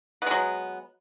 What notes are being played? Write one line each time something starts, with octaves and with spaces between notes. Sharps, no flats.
F#3 G#3 B3